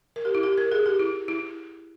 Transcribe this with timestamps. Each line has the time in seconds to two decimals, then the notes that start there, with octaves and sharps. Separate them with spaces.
0.16 A#4
0.25 G4
0.35 E4
0.43 G4
0.58 A#4
0.71 G#4
0.86 G4
0.99 E4
1.28 E4